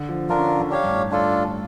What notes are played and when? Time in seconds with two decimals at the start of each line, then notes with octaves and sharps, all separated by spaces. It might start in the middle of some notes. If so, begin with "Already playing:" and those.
Already playing: D3
0.09 F3
0.29 D3 D4 F4 A#4
0.39 C#4
0.49 C#4
0.60 D3
0.70 D4 G4 C#5 F5
0.83 G2
0.90 A2
1.11 D4 F4 A4